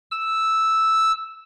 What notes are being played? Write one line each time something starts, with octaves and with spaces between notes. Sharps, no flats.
E6